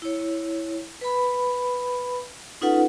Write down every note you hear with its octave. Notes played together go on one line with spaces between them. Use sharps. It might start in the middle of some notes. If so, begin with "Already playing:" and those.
E4 C#5
B4 B5
C#4 D#4 F4 A4 B4 F#5